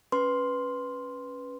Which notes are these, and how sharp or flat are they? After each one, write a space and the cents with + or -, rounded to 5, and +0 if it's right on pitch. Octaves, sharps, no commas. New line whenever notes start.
C#4 +5 B4 +0 C6 +0